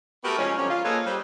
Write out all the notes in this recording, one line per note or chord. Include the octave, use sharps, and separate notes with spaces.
A3 B3 F#4 G4 A#4
C#3 F3 G#3 C#4
D3 F#3 G3 C4 C#4
F4
A#3 G#4 A4 B4 C#5 D#5
G3 F4 C5